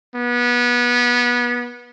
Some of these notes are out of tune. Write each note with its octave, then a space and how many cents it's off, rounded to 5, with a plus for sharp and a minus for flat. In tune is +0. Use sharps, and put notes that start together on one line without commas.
B3 -25